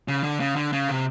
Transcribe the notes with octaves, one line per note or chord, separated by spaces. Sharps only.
C#3
D3
C#3
D3
C#3
C3